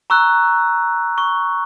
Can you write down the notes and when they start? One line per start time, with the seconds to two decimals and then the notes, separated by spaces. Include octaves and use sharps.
0.10 A#5 C#6 E6 F#6
1.18 C#6